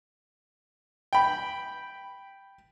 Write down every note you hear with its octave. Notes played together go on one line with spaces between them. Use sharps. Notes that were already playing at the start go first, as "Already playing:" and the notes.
G5 B5